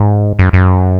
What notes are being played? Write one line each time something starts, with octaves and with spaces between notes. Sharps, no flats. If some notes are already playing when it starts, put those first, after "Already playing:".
Already playing: G#2
F#2
F#2